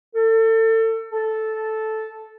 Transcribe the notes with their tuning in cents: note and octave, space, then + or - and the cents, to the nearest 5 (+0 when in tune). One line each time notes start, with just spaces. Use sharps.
A4 +30
A4 -5